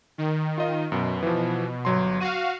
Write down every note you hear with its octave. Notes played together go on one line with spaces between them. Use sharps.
D#3
F4 D#5 F5
F#2 B2
E3 F3
G1 F#3 C6
F#4 F5 D#7